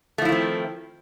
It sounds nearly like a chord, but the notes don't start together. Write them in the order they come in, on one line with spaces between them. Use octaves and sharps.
A3 F3 E4 D#3 C4